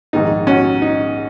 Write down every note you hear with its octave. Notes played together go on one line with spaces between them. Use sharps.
A#1 G#2 D#3 D#4
C#4 F#4
D#4